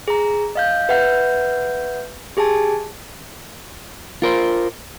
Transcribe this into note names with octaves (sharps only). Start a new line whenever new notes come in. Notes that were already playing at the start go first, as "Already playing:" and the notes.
G#4 A#5
D#5 F5 G6
B4 E5 F#5 G6
G4 G#4 G#5 A5
F4 A#4 C5